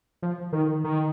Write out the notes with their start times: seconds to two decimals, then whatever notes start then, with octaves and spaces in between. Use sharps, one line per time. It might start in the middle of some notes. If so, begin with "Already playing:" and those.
0.22 F3
0.53 D#3
0.84 D#3